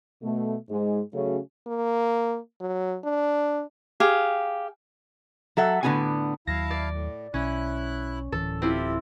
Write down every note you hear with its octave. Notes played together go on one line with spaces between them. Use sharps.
B2 A3
G#2 G#3
C#3 F#3 A3 C#4 F#4
A#3
F#3
D4
G4 G#4 F5
F#3 A4 E5 F#5
A2 D3 B3 F4 F#4 G#5
D#2 F#3 E4 F5 A5 A#6
D5
A2
B1 C#4 E4 F#6
D1 E3 A4
C4 E4 F4 G4